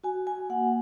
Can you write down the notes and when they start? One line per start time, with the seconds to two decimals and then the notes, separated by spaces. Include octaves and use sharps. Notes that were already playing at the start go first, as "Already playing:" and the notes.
0.04 F#4 G#5
0.27 G#5
0.49 A#3 F#5